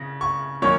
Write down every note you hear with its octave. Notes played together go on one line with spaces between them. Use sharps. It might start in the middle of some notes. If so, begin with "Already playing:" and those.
Already playing: C#3 A#6
C#6
D#3 F#3 A#3 C#4 C#5